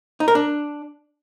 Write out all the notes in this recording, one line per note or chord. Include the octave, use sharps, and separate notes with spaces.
D#4
A#4
D4